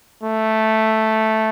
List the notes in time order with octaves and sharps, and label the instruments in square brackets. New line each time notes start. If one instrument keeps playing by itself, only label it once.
[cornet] A3